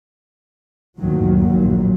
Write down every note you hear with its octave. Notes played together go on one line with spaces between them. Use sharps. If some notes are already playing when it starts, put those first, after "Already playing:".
D2 G2 A#2 D#3 F#3
A#1 D#2 A#2 F#3